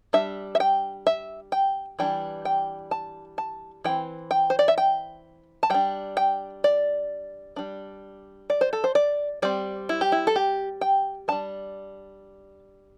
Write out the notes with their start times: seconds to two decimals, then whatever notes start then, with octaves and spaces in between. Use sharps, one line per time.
0.13 G3 D4 E5
0.55 E5
0.60 G5
1.07 E5
1.52 G5
1.99 E3 G3 D4 G5
2.45 G5
2.91 A5
3.38 A5
3.84 E3 C4 G5
4.31 G5
4.50 C5
4.59 D5
4.68 E5
4.78 G5
5.63 A5
5.70 G3 D4 G5
6.17 G5
6.64 D5
7.56 G3 D4
8.50 D5
8.61 C5
8.73 A4
8.84 C5
8.95 D5
9.42 G3 C4 D5
9.89 E4
10.01 G4
10.12 E4
10.27 A4
10.36 G4
10.81 G5
11.28 G3 D4 A5